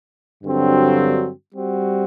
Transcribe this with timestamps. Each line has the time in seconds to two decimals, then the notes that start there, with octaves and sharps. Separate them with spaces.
0.43 G2 D3 F#3 C4 F#4
1.53 G3 C4 F#4